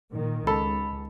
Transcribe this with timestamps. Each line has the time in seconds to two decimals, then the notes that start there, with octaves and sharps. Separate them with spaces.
0.12 A#2 D#3
0.47 C#2 A4 B5